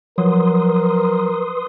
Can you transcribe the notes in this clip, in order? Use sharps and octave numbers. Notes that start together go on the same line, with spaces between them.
F3 F#3 A#4 B4 C6 D#6